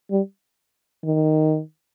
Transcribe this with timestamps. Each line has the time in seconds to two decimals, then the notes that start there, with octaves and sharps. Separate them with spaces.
0.11 G3
1.04 D#3